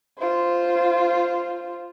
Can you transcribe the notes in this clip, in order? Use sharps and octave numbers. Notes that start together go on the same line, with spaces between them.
F4 C5